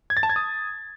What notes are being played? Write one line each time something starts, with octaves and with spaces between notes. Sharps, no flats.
G#6
A6
A5
G#6
D#6